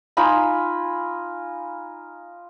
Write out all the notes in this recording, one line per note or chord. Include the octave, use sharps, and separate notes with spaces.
D#4 F4 G#5 B5